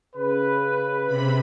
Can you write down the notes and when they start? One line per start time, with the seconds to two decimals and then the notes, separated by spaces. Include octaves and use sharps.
0.16 C#3 B4
1.07 C3 B5